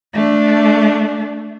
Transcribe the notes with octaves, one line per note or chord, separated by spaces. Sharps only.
A3 D4